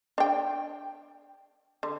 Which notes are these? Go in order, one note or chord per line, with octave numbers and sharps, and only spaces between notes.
D4 G5
D3